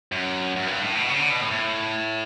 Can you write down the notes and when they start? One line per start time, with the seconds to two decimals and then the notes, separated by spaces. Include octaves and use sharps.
0.12 F#2
0.56 F#2
0.67 G2
0.82 A2
0.95 B2
1.10 C#3
1.19 D3
1.30 B2
1.41 A2
1.51 A2